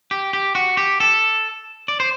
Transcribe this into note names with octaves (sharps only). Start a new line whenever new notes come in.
G4
G4
F#4
G4
A4
D5
C5